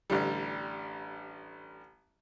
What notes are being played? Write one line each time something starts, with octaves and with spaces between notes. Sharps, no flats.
A1 D3 G3